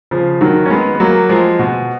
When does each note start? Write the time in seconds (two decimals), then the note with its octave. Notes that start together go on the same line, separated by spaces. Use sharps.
0.11 C#3 F3
0.41 D#3 F#3
0.66 C#4
0.70 G#3 B3
0.95 B3
1.00 F#3 A#3
1.29 F3 G#3
1.59 B2